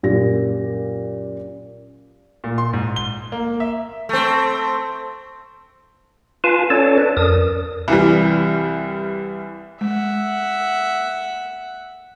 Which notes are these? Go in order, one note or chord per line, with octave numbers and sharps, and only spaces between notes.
F#2 A#2 G4 A#6
A#2
C6
G#2
G7
A#3
E5
A3 C4
F4 B4 F5 G#5 A5
C#4 A4 C#5 D5 A5
B4 D5
F2 A#4 D#6
C2 E3 G3
G#3 E5 F#5